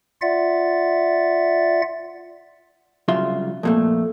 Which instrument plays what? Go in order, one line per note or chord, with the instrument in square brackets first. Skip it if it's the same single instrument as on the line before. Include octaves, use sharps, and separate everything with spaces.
[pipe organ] F4 D5 E5 F#5 A6
[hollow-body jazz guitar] C2 C#3 F#3 F4 E5 C6
F2 A#2 A3